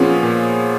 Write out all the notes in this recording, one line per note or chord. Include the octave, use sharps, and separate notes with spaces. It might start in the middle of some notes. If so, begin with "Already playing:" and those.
Already playing: A#2 F3 B3 C#4 F4 G#4
A#2